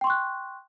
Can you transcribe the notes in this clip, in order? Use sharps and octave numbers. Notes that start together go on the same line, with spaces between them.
G5 C6 C#6 F#6